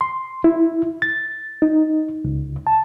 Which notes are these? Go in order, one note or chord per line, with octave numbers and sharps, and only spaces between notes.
C6
E4
A6
D#4
C#2
A5